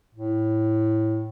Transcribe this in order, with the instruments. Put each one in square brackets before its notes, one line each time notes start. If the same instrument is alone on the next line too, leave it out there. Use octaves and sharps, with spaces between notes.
[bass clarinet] A2